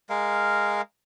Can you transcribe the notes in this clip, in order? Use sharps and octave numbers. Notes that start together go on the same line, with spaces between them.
G#3 A#4 F5